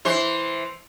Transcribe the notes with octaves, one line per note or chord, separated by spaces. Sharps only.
E3 C5